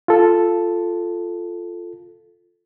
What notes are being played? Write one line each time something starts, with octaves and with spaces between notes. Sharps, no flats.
F4 A4